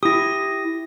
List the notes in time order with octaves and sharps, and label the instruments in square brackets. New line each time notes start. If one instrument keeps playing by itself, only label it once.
[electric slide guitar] E4 G4 [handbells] D#6 A#6